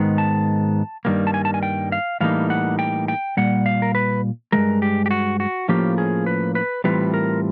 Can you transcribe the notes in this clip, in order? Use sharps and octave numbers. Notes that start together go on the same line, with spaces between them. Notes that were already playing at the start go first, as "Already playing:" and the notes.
Already playing: G#2 D#3 G#3 B3
A5
G2 D#3 G3 A#3
A5
G#5
A5
G#5
G5
F5
A2 E3 G3 A#3 D#4 F5
F#5
G5
G5
A#2 G3 F#5
F5
A#4
B4
G2 E3 G#3 A#4
G4
G4
F#4
F#4
A2 F3 A#3 C#4 F4 G4
G#4
B4
B4
A2 E3 G3 C4 F4 B4
A#4